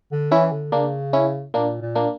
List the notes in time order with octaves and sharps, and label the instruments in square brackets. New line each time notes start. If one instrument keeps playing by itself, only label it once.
[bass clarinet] D3
[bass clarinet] E3 [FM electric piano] C#4 E4
[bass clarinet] D3
[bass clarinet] C#3 [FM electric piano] A#3 D4
[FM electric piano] C#4 E4
[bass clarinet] A#2 [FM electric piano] A#3 D4
[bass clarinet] A#2
[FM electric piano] A#3 D4